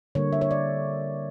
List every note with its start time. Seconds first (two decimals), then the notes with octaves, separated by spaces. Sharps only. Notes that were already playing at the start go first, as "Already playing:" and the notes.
0.15 D3 G3 A#3 C#5
0.33 E5
0.41 C#5
0.51 D5